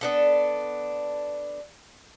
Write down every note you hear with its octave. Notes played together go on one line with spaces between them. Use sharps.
B3 D4 A4